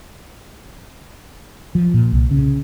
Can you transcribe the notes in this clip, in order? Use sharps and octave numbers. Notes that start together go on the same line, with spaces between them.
F3
A#2
C2
C#3